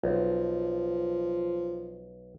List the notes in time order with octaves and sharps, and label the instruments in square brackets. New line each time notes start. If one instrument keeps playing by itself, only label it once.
[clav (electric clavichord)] B1 [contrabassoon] F3